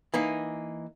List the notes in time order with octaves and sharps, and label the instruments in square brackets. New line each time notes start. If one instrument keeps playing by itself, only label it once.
[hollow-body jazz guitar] E3 A#3 D#4